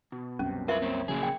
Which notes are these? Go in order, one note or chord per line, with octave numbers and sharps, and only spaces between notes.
B2
C2 F#2 C3 C#4
F4 A#4 B4 E5
A#3 C4 C#4
A#1 C#3 F#3 A#3 E4 G#4
G5